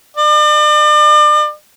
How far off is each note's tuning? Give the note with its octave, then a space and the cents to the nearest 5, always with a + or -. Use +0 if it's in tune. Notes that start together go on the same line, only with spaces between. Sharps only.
D5 +40